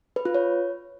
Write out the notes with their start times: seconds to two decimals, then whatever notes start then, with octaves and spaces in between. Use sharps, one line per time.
0.16 B4
0.25 F4
0.35 C#5